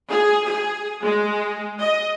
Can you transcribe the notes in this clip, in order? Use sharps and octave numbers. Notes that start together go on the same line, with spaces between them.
G#4
G#4
G#3
D#5